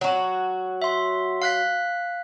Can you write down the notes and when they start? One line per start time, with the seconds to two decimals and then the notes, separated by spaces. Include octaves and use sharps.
0.01 F#3 F#4
0.82 E5 C6
1.42 F5 F#6 B6